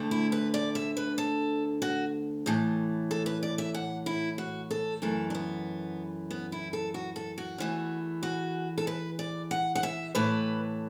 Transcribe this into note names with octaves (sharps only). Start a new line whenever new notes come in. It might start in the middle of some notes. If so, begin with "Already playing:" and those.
Already playing: D2 D3 A3
E4
B4
D5
E5
B4
A4
F#4
A2 E3 A3
A4
B4
D5
E5
F#5
E4
F#4
A4
F#2 E3 A3 A4
D4
B3
B3
E4
A4
F#4
A4
F#4
E2 E3 A3
F#4
A4
B4
D5
F#5
F#5
E5
A2 E3 A3 B4